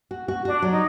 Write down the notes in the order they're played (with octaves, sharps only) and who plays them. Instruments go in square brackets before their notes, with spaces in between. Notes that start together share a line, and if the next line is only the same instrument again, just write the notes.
[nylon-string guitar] F#4
F#4
[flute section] D4 [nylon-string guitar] F#4
[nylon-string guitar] F#3
[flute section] D#4